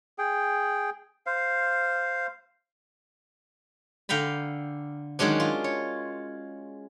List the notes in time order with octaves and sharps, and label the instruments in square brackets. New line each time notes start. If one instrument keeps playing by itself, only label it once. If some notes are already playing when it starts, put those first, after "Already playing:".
[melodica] G#4 G5
C5 F5
[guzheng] D3 F5 G5 A#5 B5
D#3 F#3 G#3 C#4 D4
F4
C#5